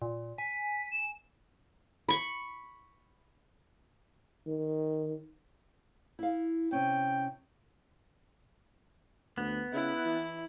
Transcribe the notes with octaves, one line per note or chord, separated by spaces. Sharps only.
A#2
G#5 B6
E7
B5 C#6
D#3
E4 F5
C3 C#4 G5
D2 B3
C#3 E4
E3